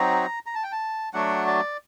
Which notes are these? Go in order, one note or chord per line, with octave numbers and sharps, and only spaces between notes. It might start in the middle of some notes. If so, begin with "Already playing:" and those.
Already playing: F#3 C4 D#4 F#4 A#5
A#5
A5
G5
A5
F#3 A3 D4 F#4 F#5
D5